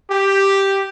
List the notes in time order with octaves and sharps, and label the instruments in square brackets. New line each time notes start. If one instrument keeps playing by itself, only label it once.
[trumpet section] G4